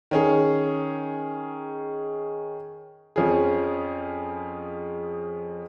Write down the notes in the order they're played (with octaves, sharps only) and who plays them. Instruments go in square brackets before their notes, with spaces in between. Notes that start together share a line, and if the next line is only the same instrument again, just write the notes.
[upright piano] D#3 C#4 G#4
F2 F3 C#4 F4 G#4